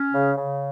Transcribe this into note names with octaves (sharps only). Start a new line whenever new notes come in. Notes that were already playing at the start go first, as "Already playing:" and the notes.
Already playing: C#4
C#3
C#3